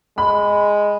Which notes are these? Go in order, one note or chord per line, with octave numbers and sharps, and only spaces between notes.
G#3 B5